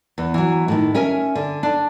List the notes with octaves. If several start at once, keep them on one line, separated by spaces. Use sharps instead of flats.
E2
E3 F#3
A2 D#3
C#4 A#4 E5 G#5
D3
D4